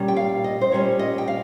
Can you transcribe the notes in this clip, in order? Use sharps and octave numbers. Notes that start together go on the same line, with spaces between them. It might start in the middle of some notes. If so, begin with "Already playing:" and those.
Already playing: A#2 G3 C#4
G5
F5
D#5
C5
A#2 G3 C#4 C#5
D#5
G5
F5